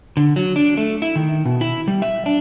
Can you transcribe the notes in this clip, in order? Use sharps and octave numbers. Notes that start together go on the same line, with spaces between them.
D3
F#3
D4
A3
E4
D#3
B2
E4
G3
E5
D4